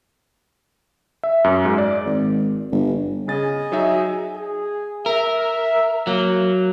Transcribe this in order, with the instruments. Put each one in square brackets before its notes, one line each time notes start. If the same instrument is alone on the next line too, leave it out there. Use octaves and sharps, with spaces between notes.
[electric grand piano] E5
F#2
G#2
D5
[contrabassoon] G#1
G1
[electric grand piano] C#3 A6 [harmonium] G#4 D#5 G#5
[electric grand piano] F#3 D#4 E5
[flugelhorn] G#4
[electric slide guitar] A#4 [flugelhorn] E5
[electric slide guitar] F#3 [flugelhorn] A#3